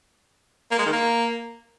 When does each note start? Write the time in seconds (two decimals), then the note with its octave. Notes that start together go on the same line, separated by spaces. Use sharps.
0.71 A#3
0.78 G#3
0.86 D#3
0.93 A#3